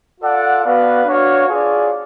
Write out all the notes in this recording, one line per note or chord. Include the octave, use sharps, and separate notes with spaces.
F4 A4 D5 F#5
B3 F#4 B4 D5 F5
D4 F#4 C#5 F5
F4 G#4 D5